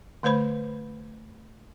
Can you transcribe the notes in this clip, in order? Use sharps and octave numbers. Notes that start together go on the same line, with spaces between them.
D3 A3 B4 C5 B5